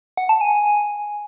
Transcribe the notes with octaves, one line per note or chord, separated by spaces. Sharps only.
F#5
A5
G#5